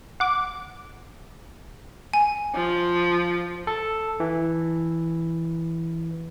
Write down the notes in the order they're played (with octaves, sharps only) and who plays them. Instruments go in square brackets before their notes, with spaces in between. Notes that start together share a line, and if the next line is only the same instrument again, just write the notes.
[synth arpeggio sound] F#5 D6
[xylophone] G#5
[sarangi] F3
[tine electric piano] A4
E3